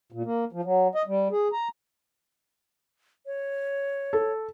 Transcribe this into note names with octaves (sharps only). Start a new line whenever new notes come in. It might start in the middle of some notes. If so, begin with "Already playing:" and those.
A#2
A#3
F3
F#3
D#5
G3
G#4
A#5
C#5
A4